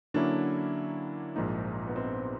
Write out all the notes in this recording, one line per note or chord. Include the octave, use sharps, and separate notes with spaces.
D3 F#3 A#3 C#4 D4 E4
A#1 G#2 F3 A#3 D#4
B3
C4